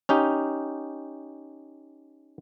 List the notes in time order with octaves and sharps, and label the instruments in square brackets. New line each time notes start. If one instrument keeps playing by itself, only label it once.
[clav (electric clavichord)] C#4 D#4 G4